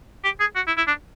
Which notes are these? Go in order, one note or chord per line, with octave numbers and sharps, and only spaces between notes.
G4
G#4
F#4
E4
E4
D4